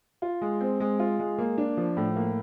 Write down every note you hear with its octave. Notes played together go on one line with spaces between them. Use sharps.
F4
G#3
C4
G#3
F4
G#3
A#3
D4
F3
A2
A#3